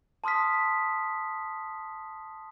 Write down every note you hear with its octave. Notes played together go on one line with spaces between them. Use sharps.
A5 C6 D#6 F6 B6